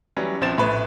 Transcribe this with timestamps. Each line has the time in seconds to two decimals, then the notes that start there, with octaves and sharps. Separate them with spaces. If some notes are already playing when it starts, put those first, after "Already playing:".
0.17 E3 F#3 G3 C#4
0.41 A#1 F3 C4 A6 E7
0.57 A#1 A2 B4